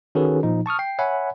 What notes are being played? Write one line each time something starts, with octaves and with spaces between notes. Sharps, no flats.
D#3 C#4 F#4 G#4 A4 B4
A#2 F3 D#4
A5 C#6 D#6 F6
G5 C7
C#5 E5 F#5 G#5 B5